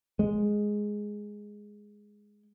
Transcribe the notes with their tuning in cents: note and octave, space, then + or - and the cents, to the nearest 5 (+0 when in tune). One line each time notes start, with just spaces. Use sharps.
G#3 +0